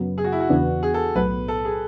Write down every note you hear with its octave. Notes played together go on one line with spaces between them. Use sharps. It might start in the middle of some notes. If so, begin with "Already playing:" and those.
Already playing: F#2 C#3 F#3 B3
G#4
F#4
E4
F#4
E2 C#3 E3 B3 D4
G#4
A4
B1 A2 F#3 B3 B4
A4
G#4